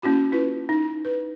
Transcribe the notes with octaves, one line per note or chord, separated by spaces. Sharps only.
A#3 C#4 E4 F#4 B5
E4 F4 B4
D#4
B4